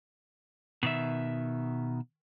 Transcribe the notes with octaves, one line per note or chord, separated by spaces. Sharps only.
B2 D#3 E5